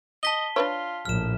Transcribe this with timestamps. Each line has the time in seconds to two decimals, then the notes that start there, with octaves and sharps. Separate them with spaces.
0.23 D#5 A5 B6 G7
0.56 D4 F4 B4 C#5
1.05 A#1 A2 F6 E7